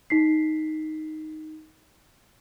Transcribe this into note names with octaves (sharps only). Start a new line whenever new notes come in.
D#4 B6 C7